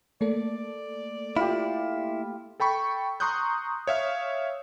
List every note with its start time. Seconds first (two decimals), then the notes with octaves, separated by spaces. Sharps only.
0.21 A3 A#3 A4 D5
1.37 E4 F4 G4
2.60 A4 G5 B5 C#6
3.20 A#5 C6 C#6 D#6 F#6 G6
3.87 C#5 E5 F5